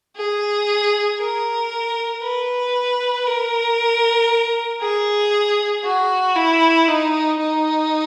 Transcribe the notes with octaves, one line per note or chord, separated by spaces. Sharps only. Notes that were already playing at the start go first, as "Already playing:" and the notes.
G#4
A#4
B4
A#4
G#4
F#4
E4
D#4
D#4